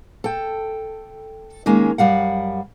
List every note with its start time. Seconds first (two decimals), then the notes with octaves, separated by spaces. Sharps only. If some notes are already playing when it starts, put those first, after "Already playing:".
0.24 A4 G5
1.66 D#3 G#3 A#3 C#4
1.98 F#2 G3 F5 F#5